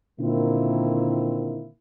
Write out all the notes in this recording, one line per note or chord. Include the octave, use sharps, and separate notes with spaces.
A#2 D3 D#3 A#3 C4 E4